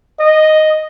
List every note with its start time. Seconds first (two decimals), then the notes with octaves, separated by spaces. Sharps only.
0.20 D#5